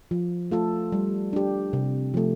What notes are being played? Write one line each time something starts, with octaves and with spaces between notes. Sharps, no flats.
F3
A3 F4 A4
G3
D4 G4
C3
F3 A3